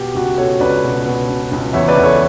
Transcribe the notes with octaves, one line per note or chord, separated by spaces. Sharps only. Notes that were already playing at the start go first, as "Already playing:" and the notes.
Already playing: B2 G4
C#2 F#4
B2 A4 C#5
C#2 B4 D5
B2
B2
C#2
C#2
E2 C#5 E5
B4 D5
E2
A4 C#5